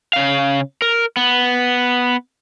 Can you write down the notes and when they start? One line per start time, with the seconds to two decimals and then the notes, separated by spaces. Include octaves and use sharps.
0.13 C#3 F5
0.82 A#4
1.17 B3